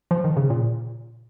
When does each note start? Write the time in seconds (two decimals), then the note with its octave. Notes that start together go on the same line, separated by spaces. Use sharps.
0.11 F3
0.24 D#3
0.37 C#3
0.50 A#2